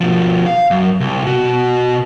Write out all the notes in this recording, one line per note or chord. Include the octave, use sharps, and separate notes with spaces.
B2 F3
F5
F#2
C2
B2 F#4